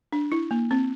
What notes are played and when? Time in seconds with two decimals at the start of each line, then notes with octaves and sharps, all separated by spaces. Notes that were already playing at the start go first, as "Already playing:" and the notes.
0.12 D4
0.32 E4
0.51 A#3
0.71 C4